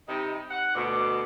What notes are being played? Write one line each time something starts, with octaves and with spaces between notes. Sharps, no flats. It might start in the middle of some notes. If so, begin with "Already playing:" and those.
C3 G3 D#4
F#5
D2 B2 D6